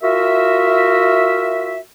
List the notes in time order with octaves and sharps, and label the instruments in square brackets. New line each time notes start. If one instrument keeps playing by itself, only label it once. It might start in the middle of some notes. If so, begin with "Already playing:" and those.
[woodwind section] F4 F#4 A#4 E5